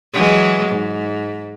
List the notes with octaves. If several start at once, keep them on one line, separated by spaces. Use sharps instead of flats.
E3 F#3 G#3
G#2